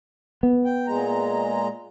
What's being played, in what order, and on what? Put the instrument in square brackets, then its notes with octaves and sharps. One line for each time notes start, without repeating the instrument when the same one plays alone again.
[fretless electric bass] B3
[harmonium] G5
A#2 G#3 A#5